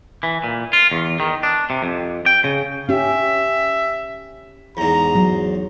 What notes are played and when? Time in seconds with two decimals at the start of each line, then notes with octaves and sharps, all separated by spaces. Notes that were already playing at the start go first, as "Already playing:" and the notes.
0.23 E3
0.44 A#2
0.73 F4
0.92 E2
1.20 D#3
1.43 D4
1.70 C3
1.83 F2
2.26 G5
2.44 C#3
2.89 C#4 G4 E5
4.77 E2 G#2 A#5
5.15 F#3